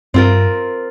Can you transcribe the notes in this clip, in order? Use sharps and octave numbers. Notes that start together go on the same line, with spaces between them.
G2 C4 F4 A#4